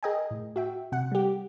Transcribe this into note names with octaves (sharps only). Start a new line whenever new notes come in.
G#4 A#4 D#5 G5 G#5
A2
F#4 E5 G5
C3 F#5
G3 G4